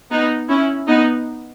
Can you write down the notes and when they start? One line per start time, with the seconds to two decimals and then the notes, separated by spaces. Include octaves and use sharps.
0.11 B3 D#4
0.49 C#4 E4
0.88 B3 D#4